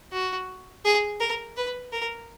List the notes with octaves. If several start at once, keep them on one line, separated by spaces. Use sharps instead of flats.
F#4
G#4
A#4
B4
A#4